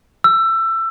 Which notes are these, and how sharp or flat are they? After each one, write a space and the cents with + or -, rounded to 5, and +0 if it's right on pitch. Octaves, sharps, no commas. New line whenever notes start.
E6 +20